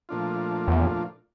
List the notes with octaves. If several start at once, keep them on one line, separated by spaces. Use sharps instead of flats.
A#2 F3 A3 D4 F4
E2